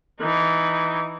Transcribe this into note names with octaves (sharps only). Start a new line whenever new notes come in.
E3 D#4